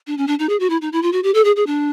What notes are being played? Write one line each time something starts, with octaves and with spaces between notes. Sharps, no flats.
D4
C#4
D4
D#4
G#4
F#4
E4
D#4
E4
F4
F#4
G4
A4
G#4
G#4
D4